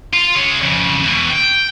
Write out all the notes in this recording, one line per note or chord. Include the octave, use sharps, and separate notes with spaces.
F4
G#3 C#5
F2 C#3
B2 E3
G5